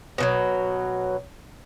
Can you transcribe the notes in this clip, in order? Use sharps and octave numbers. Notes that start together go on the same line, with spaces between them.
B2 E3 F#3